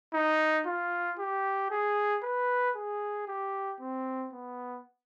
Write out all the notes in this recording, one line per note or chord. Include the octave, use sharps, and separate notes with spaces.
D#4
F4
G4
G#4
B4
G#4
G4
C4
B3